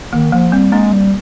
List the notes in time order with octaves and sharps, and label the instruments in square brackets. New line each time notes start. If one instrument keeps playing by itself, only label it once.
[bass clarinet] D#3 [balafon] A#3
[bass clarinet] F3 [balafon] A#3
[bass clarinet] G3 [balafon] C4
[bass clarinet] G#3 [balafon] A#3 D4
[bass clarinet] G3